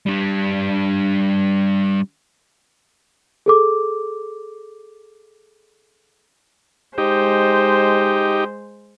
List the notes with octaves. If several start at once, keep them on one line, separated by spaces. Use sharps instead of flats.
G3 D4
G#4 A4 D6
G#3 D#4 G4 C5